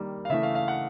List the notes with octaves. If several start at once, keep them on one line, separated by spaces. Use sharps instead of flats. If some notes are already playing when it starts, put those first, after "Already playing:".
Already playing: D#3 G3 A#3
F5
C#3 E3 A3 E5
F5
F5
F#5